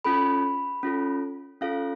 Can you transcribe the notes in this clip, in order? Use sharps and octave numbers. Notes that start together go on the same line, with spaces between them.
C#4 F4 A4 B5
C#4 F4 A4
C#4 F4 A4 F5